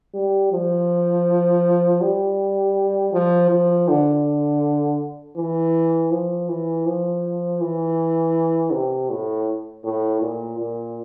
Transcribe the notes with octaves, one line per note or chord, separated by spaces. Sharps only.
G3
F3
G3
F3
F3
D3
E3
F3
E3
F3
E3
C3
A2
A2
A#2
A#2